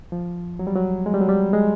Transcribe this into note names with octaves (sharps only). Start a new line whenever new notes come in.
F3
F#3
G3
F#3
G#3
G3
F#3
G3
G#3